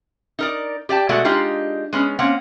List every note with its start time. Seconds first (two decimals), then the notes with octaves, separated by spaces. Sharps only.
0.39 D#4 A#4 D5
0.89 G4 D5 G5 A5
1.09 B2 G#3 A3 F#4 D5 F#5
1.25 G#3 D4 D#4 F4 G4
1.93 G#3 B3 C#4
2.19 A#3 C4 C#4 F#5